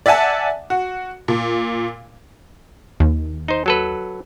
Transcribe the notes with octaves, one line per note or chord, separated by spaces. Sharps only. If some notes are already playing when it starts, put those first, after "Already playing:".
D5 E5 F#5 G#5 A5
F#4
A#2
D#2
D#4 C5
F#3 A4 B4